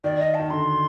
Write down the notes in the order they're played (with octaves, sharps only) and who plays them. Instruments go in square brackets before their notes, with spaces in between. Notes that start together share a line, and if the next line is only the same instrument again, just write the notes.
[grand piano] D#3 [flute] D5
[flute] D#5
A5
[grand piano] D#3
[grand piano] D3 [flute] C6